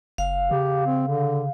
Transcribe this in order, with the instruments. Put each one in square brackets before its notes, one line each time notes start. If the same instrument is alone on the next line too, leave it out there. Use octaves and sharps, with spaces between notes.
[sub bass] F#1 [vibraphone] F5
[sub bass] C#3 [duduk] G4
[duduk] C4
D3